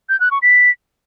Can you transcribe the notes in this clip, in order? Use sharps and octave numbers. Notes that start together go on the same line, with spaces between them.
G6
F#6
C#6
B6